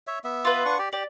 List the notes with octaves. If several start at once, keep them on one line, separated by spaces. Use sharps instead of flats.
C#5 E5
B3 E5
F4 B4
D4 F#5 C#6
G4 D5
G4 D5